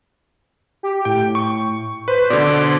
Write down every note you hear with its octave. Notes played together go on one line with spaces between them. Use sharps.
G4
A2 G5
C#6
B4 C5
B2 D3 D5